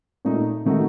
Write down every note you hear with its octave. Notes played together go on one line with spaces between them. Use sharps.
A#2 A3 D#4
D#3 A3 D#4 F#4